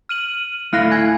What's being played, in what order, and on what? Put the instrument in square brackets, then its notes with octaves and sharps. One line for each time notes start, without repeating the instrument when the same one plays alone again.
[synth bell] F6 D#7 F#7
[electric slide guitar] A3 E4 F5 [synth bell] F6 F#6 A#6
[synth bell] G#5 G#6